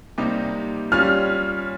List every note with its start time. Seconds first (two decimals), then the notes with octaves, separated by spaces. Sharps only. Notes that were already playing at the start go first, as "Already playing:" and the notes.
0.18 C3 G3 A#3 D#4 G4
0.92 G3 C#4 F4 F6